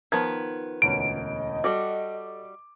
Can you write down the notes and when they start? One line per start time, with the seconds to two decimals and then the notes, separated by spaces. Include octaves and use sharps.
0.12 D#3 F3 B3 G#6
0.82 E1 D2 C#4 D#5 D7
1.64 G3 F#4 A4 D6